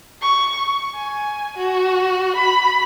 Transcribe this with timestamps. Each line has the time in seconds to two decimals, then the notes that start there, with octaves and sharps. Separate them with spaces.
0.22 C#6
0.95 G#5
1.57 F#4
2.36 B5